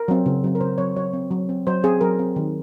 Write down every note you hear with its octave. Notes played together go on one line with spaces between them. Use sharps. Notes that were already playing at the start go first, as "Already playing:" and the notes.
Already playing: A#4
F#3 C4
C#3
F#3 C4
A#4
C#3 C5
F#3 C4 C#5
F#3 C#5
C4
F#3
C4
F#3 C5
C4 G#4
F#3 A#4
C4
D#3